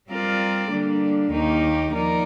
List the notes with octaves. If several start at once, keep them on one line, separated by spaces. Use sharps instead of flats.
G3 C4 F4 A#4 D5
D3 G3 A#3 D4
D#2 D#3 A#3 D#4 G4
F3 A#3 D#4 A#4 D5